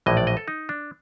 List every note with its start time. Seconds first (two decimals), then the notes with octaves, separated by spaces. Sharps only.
0.06 A#1 A2 E3 D#5
0.17 D5
0.27 D#5
0.37 A4
0.48 D#4
0.69 D4